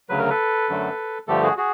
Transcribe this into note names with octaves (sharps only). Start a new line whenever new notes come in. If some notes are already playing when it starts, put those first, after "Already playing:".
D2 C#3 F#3 B4
A#4
A4 B4
F#2 D3 F#3 A3
G2 D3 F3 A3 G4 A4
F#4 G#4
F#4 G#4